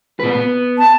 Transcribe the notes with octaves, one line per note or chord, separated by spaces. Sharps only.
A#2 B4
B3
A5